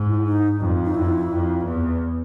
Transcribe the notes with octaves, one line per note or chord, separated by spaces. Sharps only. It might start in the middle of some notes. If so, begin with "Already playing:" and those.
Already playing: G#2
E4
D#4
F2
D#4
F2 E4
F2
E2